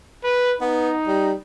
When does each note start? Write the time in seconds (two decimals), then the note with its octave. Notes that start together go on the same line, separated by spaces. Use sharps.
0.24 B4
0.61 B3 D#4
1.07 G3